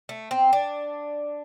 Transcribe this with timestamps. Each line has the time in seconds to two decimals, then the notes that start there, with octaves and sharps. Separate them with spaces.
0.09 A3
0.31 C4
0.53 D4